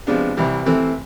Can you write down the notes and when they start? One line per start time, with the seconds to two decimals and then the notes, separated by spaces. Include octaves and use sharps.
0.07 C3 F3 G#3 B3 D4
0.37 C2 C3 E3 G3
0.66 C3 E3 A3 C4